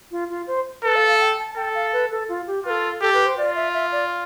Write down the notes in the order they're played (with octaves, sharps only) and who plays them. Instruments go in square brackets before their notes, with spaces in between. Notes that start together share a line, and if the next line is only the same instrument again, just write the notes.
[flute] F4
F4
C5
[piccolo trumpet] A4 [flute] B4
[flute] F5
F5
G5
A5
[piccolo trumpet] A4 [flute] G5
[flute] F5
B4
A4
F4
G4
[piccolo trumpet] F4 [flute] B4
[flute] A4
[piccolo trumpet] G4 [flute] A4
[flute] B4
C5
[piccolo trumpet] F4 [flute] D5
[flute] E5
E5
D5